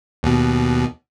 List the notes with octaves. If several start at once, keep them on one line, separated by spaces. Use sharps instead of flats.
D#2 B2